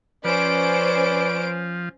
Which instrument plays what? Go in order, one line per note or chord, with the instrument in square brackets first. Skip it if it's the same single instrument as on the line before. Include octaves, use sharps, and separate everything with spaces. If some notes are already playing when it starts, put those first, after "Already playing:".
[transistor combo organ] F3 [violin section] C#4 C5 D7 [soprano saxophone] B4 [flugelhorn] D5